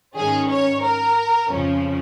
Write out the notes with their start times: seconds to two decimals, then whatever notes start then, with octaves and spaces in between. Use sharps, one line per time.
0.17 G#2 D#3 C#4 G#4
0.51 C#5
0.84 A#4
1.50 F2 C#3 F3 C#4